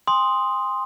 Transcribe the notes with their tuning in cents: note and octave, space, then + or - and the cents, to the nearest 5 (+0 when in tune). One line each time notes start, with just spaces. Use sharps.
G#5 -45 C6 +0 D#6 +0